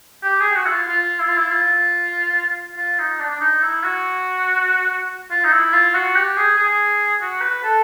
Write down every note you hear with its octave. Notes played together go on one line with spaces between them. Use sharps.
G4
G#4
F#4
E4
F4
F4
E4
F4
E4
F4
F4
D#4
D4
D4
D#4
E4
F#4
F4
D#4
E4
F4
F#4
G4
G#4
G#4
F#4
B4
A4